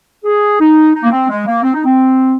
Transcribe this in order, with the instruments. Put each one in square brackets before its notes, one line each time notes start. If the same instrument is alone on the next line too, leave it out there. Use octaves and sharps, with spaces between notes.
[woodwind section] G#4
D#4
D#4
A#3
C4
G#3
A#3
C4
D#4
C4